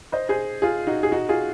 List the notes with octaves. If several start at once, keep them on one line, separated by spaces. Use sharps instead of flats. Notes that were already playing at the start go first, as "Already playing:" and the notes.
C5 D#5
G#4 C5
F4 G#4
D#4 F#4
G#4
D#4 F#4
F4 G#4